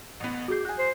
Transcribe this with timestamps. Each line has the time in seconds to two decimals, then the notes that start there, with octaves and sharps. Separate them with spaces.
0.20 A1 B3
0.48 F#4 G#4 D6 G6 C7
0.65 F#4 G#4 F#6
0.79 C5